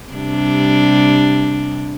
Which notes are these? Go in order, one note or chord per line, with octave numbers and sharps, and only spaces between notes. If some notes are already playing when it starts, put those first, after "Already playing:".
C3 G3 D4